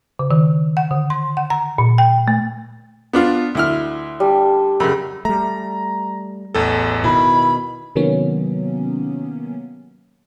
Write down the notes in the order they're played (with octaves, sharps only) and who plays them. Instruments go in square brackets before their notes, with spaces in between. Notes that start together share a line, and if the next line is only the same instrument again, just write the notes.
[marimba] C#3
D#3
F#5
D3
C6
F#5
A#5
A#2
G5
A3
[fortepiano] B3 D4 F4
D2 E4 F6
[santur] G3 D4
[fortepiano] F#2 C#3 [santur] B5
[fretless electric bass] G3 A3 [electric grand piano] A#5
[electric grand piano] A1 E2 A4
[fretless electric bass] B2 D#3 [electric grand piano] E4 [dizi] B5
[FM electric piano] C3 D#3 F#3 A#3 B3 C#4